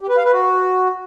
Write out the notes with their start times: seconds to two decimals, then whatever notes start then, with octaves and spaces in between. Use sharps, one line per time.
0.01 G4
0.09 B4
0.17 F5
0.25 B4
0.33 F#4